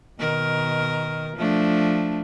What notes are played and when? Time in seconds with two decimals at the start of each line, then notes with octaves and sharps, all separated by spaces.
0.18 B2 D#3 A#4
1.37 F3 A3 D4